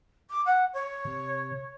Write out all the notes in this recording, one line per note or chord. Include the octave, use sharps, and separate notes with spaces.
D6
F#5
C#5
C3